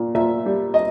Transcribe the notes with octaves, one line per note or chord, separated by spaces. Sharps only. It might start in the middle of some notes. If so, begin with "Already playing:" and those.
Already playing: A#2
A#2 E5
G3
D#5